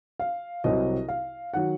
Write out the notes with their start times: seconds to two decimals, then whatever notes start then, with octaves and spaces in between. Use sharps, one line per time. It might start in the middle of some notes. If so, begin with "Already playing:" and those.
0.20 F5
0.64 C2 C3 F#3 D#5
1.09 F5
1.54 D#3 F#3 F#5